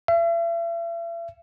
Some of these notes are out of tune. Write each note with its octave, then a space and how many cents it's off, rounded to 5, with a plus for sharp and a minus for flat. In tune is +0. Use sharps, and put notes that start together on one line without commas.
E5 +40